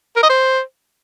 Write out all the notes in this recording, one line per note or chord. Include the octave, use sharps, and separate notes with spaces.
A#4
D#5
C5